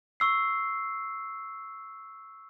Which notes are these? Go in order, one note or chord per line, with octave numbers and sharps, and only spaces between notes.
C#6 E6 C7